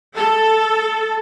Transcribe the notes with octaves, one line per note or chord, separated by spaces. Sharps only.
A4